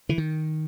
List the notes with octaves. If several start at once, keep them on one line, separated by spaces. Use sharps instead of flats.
D3 E3
D#3